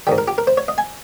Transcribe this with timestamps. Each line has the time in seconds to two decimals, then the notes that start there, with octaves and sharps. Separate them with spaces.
0.07 G#2 D#3 G3 G5
0.18 A#4
0.28 G4
0.38 A#4
0.47 C5
0.57 C#5
0.68 D#5
0.78 G#5